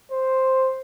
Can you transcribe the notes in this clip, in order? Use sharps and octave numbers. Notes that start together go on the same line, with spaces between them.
C5